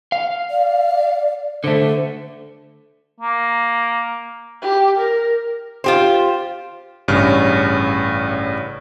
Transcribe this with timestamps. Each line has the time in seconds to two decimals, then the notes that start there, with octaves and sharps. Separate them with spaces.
0.12 F5
0.50 D5
1.64 D3 A3 C5
3.20 A#3
4.62 G4
4.98 A#4
5.84 F4 G4 C5
7.08 A1 G2 C#3 C#5 F6